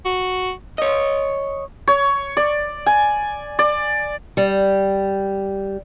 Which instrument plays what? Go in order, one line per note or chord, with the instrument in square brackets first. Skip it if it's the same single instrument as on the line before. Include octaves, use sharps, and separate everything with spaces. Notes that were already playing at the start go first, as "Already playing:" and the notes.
[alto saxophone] F#4
[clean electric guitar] C#5 D#5
[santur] C#5
D5
G#5
D5
[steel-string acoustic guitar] G3